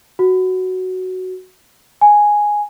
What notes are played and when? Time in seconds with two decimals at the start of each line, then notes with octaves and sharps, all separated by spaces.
0.19 F#4
2.01 G#5